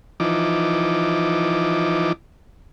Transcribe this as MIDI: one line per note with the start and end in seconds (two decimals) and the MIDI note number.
0.20 2.12 52
0.20 2.12 53
0.20 2.12 63
0.20 2.12 86